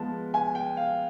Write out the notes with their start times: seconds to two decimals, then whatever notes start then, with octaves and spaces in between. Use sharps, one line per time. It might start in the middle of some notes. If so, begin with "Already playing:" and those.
Already playing: F3 G#3 B3 A5
0.34 G#5
0.55 G5
0.77 F5